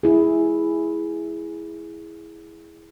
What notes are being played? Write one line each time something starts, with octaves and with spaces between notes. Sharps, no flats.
E4 G#4